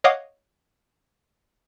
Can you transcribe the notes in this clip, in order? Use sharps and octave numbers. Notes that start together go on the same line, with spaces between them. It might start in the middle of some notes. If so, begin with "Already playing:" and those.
C#5 D#5 F5 F#5 D6 D#6